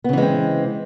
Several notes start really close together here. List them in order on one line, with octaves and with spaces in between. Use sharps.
B3 C#3 E3 G#3 C4